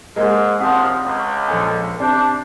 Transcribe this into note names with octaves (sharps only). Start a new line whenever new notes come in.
G#2 G#3 A#3 D#5
A#1 D#2 C3 F3 F#5 D#6
C#2
A#1 A4 G#5
C3 D4 D5 G6